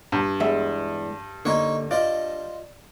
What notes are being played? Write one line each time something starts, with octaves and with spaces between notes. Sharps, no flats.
G2
E2 G#3 E5
D3 A#3 D#4 C5 C#5
F4 C5 D5 D#5